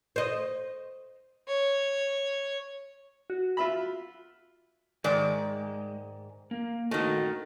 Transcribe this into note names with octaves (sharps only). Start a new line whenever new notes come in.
C5 D#5
C#5
F#4
F4 E5 B5
G#2 D#3 G#3 D5
A#3
D#3 A3 F#4 A#4 D#5